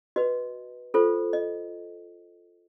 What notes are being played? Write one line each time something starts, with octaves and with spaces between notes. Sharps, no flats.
F#4 B4 D#5
F4 A4 C5
D#5